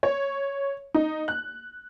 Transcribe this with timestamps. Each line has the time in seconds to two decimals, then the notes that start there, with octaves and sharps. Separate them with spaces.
0.03 C#5
0.94 D#4
1.28 F#6